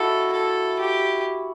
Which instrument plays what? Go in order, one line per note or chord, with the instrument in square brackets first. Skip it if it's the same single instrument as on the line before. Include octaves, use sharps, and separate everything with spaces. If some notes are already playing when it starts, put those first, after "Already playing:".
Already playing: [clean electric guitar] E4 F#4 [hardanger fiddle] A4
[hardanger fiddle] A4
G4